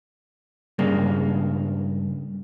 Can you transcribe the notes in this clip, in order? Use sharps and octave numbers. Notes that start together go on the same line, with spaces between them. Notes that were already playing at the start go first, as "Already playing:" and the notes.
G2 C#3 G#3 A#3